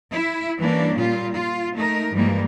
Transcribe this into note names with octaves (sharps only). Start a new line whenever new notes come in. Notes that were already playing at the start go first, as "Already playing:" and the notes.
E4
E3 G3 A#3 C#4 D4
A#2 G3 F4
F4
A3 D#4 A#4
G2 E3 F3 G3 G#3 A#3